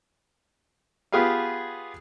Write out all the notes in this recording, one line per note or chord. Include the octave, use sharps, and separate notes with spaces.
B3 F4 G4 G#4 B4 F5